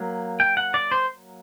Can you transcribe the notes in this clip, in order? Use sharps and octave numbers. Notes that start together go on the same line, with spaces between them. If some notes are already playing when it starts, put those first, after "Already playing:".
Already playing: F#3 A#3
G5
F#5
D5
C5